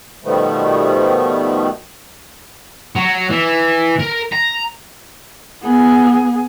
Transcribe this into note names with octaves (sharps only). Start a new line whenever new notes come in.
B2 D#3 F3 G3 A3 B3
F#3
E3
A#4
A#5
B3 G#4